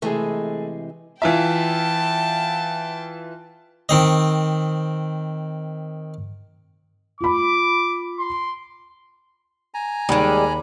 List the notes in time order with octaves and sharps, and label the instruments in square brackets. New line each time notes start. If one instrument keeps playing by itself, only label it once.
[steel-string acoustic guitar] C3 E3 G#3 [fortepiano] A3 G#4
[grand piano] E3 F4 E5 [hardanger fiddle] G5 A5
[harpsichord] D#3 C4 D#5
[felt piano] F4 B5 [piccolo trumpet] D6
[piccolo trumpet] C6
[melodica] G#5 A#5
[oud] D#2 [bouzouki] G3 G#3 [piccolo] B5